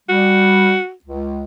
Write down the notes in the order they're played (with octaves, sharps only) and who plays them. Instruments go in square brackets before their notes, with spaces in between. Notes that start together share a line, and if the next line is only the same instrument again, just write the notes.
[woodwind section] G3 [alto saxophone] F#4
[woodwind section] C#2